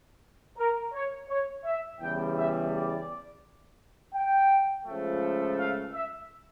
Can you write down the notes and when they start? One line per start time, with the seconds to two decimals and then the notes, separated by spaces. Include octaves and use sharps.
0.58 A#4
0.94 C#5
1.29 C#5
1.65 E5
2.00 E2 C#3 G3 G5
2.36 E5
2.72 D5
4.14 G5
4.86 C#2 C#3 F3 A3
5.57 F5
5.93 E5